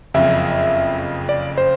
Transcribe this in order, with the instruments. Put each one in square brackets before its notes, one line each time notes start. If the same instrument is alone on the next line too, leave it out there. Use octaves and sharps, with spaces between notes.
[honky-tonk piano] F#1 F2 C#3 F3 [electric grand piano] E5
[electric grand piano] D5
C5